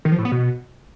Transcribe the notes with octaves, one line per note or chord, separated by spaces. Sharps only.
D#3
F3
A2
B3
B2